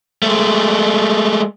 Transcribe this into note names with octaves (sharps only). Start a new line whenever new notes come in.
G#3 A3